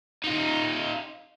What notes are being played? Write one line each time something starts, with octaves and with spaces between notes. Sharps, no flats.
D#4 F4